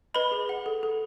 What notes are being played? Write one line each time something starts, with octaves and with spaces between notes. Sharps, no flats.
B4 D#5 B5
G#4
F#5
A4
A4